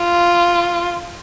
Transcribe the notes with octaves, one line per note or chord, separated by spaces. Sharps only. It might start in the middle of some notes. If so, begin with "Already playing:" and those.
Already playing: F4